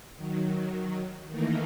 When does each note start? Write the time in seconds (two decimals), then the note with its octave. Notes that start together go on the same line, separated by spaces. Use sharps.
0.17 D#3 F#3
1.29 D#3 E3 A3 A#3 D#4